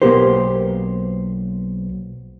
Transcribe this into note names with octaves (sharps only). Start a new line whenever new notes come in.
B1 A#3 B3 G4 A#4 C5